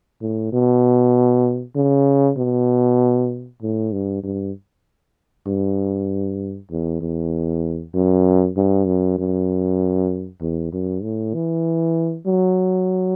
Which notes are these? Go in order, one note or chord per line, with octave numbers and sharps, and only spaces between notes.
A2
B2
C#3
B2
A2
G2
G2
G2
E2
E2
F#2
G2
F#2
F#2
E2
F#2
A2
E3
F#3